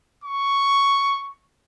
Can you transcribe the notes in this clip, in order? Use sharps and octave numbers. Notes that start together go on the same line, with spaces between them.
C#6